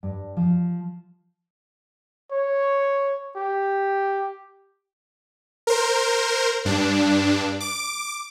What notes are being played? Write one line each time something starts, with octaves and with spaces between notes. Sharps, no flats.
G2
F3
C#5
G4
A#4 C5
G2 D4
D6